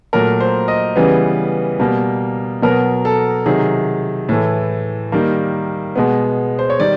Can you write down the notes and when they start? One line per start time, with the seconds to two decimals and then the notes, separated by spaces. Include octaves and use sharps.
0.13 A#2 F#3 A3 A#4
0.41 C5
0.68 D#5
0.96 C#3 E3 G3 B3
1.79 B2 G3 A#3
2.62 B2 F#3 B3 A#4
3.05 A4
3.46 C3 D#3 F#3 G#4
4.29 A2 E3 A3
5.12 D#3 G3 A#3
5.96 B2 G#3 B3
6.59 C5
6.70 C#5
6.80 D#3 G3 D5